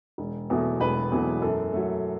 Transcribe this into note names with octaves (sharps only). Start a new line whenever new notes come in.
E1
E2 B2 F#3 A3
E1 B4
E2 B2 F#3 A3
F#2 A4
F#3 A3